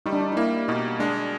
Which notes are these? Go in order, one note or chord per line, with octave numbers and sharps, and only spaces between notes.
G3 D#4
D4
D#4
D#4
A#3 E4
B2 D#4
G#3 D4